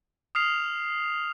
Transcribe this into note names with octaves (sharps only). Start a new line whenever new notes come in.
D#6 F6 C7 F7